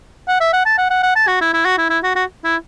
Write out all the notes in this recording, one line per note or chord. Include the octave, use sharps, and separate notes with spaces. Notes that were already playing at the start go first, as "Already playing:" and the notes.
F#5
E5
F#5
A5
F#5
F#5
F#5
A5
F#4
E4
E4
F#4
E4
E4
F#4
F#4
E4